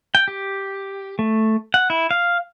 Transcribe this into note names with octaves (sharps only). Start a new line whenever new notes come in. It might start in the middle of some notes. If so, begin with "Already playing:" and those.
G5
G4
A3
F#5
E4
F5